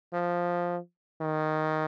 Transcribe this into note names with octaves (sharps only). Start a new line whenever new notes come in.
F3
D#3